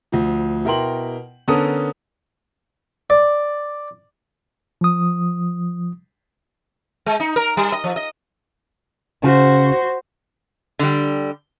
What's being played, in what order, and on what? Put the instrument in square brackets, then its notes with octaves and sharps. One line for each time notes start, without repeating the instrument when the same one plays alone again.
[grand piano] D2 F3
B2 E4 A#4 G5 C6 F#7
D3 B3 C#4 A4 A#4 D#6
[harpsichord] D5
[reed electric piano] F3 D#6
[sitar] G#3
D#4
A#4
G3
D#5
F3
D#5
[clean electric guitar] C#3 [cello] F#4 C5
[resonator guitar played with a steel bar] D3 G3